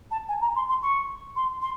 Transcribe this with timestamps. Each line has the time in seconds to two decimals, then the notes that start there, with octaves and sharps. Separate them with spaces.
0.11 A5
0.28 G#5
0.41 A#5
0.55 C6
0.68 C6
0.82 C#6
1.36 C6
1.62 C6